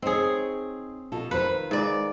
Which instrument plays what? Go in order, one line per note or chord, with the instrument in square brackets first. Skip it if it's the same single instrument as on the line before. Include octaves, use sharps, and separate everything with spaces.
[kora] C4 G#4 [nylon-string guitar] D#4 C#5
[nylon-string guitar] B2 F4 A4
[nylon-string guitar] D#3 F4 C5 [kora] B4
[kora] G#2 D5